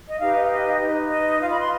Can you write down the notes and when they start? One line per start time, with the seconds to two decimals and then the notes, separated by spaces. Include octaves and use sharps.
0.09 D#5
0.20 D#4 G4 B4 F5
0.36 D#5
0.43 F5
0.52 D#5
0.80 D#4 B4 D#5
1.10 D#5
1.40 F4 B4 F5
1.51 B5
1.61 C6